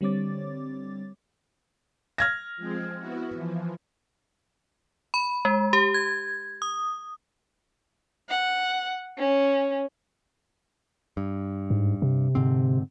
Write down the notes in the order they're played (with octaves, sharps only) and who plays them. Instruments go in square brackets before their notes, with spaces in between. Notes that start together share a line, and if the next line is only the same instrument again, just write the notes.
[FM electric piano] D3 G3 C4 C#5 D6 A6
[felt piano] F6 G#6 A#6
[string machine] F3 G#3 C4
B3 E4 F#4
E3 F3
[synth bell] B5
G#3
G4
G#6
D#6
[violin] F#5
C#4
[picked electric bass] G2
[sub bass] G#2
C3
[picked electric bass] G#2 D3 C4